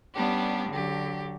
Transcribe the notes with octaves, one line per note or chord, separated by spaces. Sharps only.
G3 B3 C#4 D4 G4
D3 F#3 G4